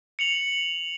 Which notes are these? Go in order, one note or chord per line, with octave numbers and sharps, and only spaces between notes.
C#7 F7 F#7